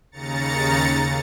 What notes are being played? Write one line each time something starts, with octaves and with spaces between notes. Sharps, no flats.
D#2 C#3 A#5 A6 C#7